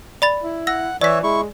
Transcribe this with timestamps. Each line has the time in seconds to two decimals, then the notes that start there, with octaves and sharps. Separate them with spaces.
0.22 D5 B5 A6
0.43 E4
0.67 F#5 E6 A#6
1.01 E3 C#5 D5 E5 B6
1.23 G#3 E4 C#6